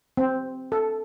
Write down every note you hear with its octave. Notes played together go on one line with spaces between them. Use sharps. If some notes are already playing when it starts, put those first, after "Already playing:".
C4
A4